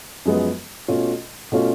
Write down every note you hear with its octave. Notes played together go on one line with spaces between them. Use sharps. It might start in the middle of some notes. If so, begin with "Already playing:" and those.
F#2 F3 G#3 B3
B2 A3 C#4 F4
B2 A3 C#4 F4